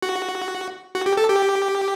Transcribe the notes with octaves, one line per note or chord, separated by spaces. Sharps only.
F#4
F#4
G4
A4
G4